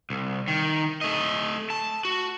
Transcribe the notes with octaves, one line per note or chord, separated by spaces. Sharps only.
C2
D#3
A3 D#5
A5
F#4